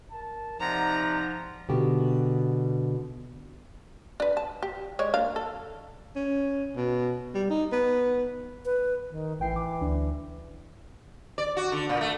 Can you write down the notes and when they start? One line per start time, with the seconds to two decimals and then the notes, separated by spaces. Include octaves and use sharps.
0.11 A#4 A5
0.60 C3 F3 D#4 D5 F#5 A#5
1.69 B2 D3 G4
4.20 D4 B4
4.37 A5
4.63 G4
4.99 G#3 C#5 D5
5.14 A#3 D4 F5
5.36 A4
6.16 C#4
6.76 B2
7.35 G3
7.50 D#4
7.72 B3
8.65 B4
9.10 D#3
9.39 A1 E3 G5 C7
9.56 D6
9.81 D2 D4
11.38 D5
11.57 F#4
11.72 D3
11.89 A#2
12.01 A3